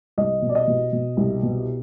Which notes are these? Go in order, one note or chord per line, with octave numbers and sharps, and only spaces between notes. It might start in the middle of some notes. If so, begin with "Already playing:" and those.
C2 D#5
B2
D5
D#5
B2
B2
C2
B2